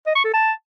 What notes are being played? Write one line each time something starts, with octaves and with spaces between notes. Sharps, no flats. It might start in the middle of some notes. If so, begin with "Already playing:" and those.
D#5
C#6
A4
A5